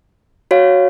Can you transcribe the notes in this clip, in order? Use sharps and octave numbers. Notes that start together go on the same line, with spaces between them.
F#4 C#5 F5